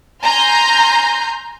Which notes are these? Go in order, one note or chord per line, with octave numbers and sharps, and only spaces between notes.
G#5 A#5 C6 F6 G6 A#6